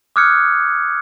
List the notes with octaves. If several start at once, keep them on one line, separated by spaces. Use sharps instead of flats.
D6 D#6 F6 F#6 G#6 C#7